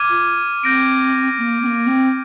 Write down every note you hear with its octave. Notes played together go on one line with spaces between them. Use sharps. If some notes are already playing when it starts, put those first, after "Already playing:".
Already playing: D6 F6 G#6 D#7
F4
C4 G6 A#6 D7
A#3
C4
A#3
C4